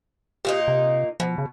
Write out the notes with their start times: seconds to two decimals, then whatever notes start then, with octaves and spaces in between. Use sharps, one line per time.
0.45 A#2 A#3 D#4 G4
0.68 C3
1.20 B2 F3
1.38 C#3